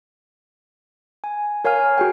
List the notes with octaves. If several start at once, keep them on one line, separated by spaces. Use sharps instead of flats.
G#5
A#4 C#5 F5 G#5 F6
F#4 G#4 G5